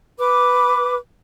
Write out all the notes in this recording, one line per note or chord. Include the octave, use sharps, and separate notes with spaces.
B4 D6